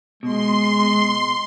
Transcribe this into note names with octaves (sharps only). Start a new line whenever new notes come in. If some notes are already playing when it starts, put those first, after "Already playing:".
B2 G#3 C6